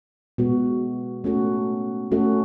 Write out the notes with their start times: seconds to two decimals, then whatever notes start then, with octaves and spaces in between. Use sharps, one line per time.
0.38 B2 G#3 B3 F#4
1.24 A3 C#4 F#4 A4
2.12 A3 C#4 F#4 A4